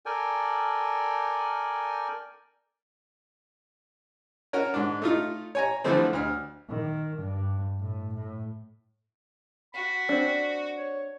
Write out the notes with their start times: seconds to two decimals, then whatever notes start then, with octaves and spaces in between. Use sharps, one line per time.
0.06 A4 A#4 D5 G5 G#5
4.53 C#4 F#4 A#4
4.74 G#2 D4
5.02 A3 D#4 F4
5.55 C#5 G#5 A#5
5.84 D3 E3 F3 G3 A3 C4
6.13 D2 F6
6.69 D#3
7.15 G2
7.80 A2
8.14 A2
9.74 F#4 B5
10.09 C4 D4
10.77 C#5